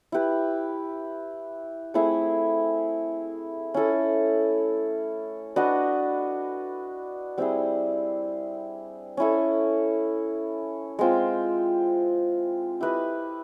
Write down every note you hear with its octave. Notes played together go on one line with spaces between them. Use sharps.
E4 G4 B4
A3 C4 E4 G#4
C#4 E4 A4
D4 F#4 B4 D#5
G3 C4 E4 G#4
C#4 E4 A4
G#3 C4 F4
E4 G4 B4 D#5